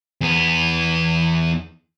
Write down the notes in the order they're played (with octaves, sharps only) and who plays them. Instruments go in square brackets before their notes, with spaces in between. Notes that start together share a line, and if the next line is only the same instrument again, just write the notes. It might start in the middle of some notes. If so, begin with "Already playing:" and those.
[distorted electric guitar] E2 B3